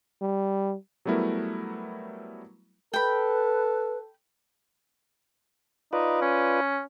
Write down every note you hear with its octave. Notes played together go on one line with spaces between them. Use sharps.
G3
F#3 G3 A3 B3 E4 A#4
A4 B4 G5 B5
D#4 F4 B4 D5
C#4